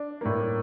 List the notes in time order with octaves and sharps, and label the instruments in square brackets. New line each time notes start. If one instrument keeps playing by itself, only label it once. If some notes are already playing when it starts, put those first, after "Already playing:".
Already playing: [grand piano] D4
A2 G3 A#3